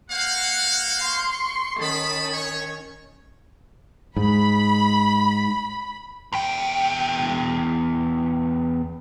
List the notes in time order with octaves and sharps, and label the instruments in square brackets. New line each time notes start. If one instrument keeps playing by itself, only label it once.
[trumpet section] A#3 C5 F5 [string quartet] F#5
[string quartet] C6 C#6
[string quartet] D#3 C#4 [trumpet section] A5 B5
[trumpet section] C#5
[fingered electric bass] G#2 [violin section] B5
[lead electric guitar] E2 G5